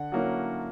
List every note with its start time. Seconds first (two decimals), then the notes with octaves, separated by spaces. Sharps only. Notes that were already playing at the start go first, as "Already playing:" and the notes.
Already playing: D3 F#5
0.12 F#3 A#3 C#4 E4